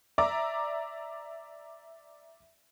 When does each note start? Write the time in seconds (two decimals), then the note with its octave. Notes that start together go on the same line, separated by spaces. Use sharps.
0.18 D5 E5 A#5 D6